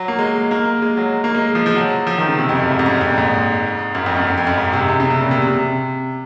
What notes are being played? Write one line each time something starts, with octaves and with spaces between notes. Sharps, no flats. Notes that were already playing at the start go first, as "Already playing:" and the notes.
Already playing: F#3
A#3
G#3
A#3
G#3
F#3
A#3
G#3
F3
F3
F#3
F3
D#3
C#3
C3
F2
F#2
G#2
F2
F#2
F2
A#2
G#2
F#2
F2
F#2
F2
F2
F#2
G#2
C3
C3
C#3
C3
A#2
C3
C3